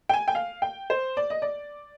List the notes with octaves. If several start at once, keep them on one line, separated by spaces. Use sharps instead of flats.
G5
G#5
G5
F5
G5
C5
D5
D#5
D5